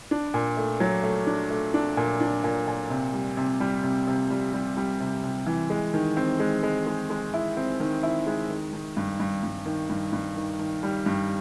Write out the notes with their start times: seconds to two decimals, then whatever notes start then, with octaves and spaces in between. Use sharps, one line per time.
0.11 D4
0.34 A#2
0.57 A3
0.80 F#3
1.03 A3
1.27 D4
1.50 A3
1.74 D4
1.97 A#2
2.20 D4
2.44 A#2
2.67 A#2
2.90 C3
3.13 G3
3.37 C3
3.60 G3
3.84 C3
4.07 C3
4.30 G3
4.53 G3
4.77 G3
5.00 C3
5.23 C3
5.47 E3
5.70 G#3
5.94 D#3
6.17 C4
6.40 G#3
6.63 G#3
6.87 G#3
7.10 G#3
7.34 E4
7.57 C4
7.80 D#3
8.03 E4
8.26 G#3
8.50 D#3
8.73 D#3
8.97 G2
9.20 G2
9.43 G2
9.66 D#3
9.89 G2
10.13 G2
10.36 D#3
10.59 D#3
10.83 G3
11.06 G2